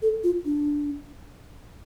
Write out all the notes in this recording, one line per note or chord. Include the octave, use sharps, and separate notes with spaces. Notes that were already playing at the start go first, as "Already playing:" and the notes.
A4
F4
D4